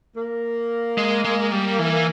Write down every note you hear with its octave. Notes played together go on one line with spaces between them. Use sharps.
A#3
G#3
G#3
G3
E3